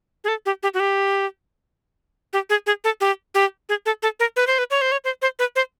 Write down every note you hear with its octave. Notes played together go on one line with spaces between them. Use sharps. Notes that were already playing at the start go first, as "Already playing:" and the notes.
G#4
A4
G4
G4
F#4
G4
G4
G#4
G#4
A4
G4
G4
G#4
A4
A4
A#4
B4
C5
B4
C#5
C5
C#5
C5
C5
B4
C5